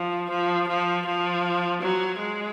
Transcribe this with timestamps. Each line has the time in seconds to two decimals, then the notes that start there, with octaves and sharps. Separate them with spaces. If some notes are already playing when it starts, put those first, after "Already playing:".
Already playing: F3
0.30 F3
0.68 F3
1.06 F3
1.81 F#3
2.19 G#3